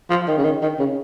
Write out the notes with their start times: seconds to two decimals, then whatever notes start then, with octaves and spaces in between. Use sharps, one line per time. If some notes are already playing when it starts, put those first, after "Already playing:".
0.10 F3
0.28 D#3
0.37 C#3
0.44 D#3
0.62 D#3
0.79 C#3